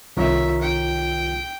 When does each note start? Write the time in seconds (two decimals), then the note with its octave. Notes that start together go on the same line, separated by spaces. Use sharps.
0.17 C2 D#3 F4 A#4 C#5 E5
0.61 G5